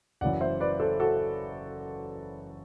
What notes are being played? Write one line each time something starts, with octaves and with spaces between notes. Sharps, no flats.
F#1 F#2 E3 D5 F#5
C5 E5
B4 D5
A4 C5
F#4 A4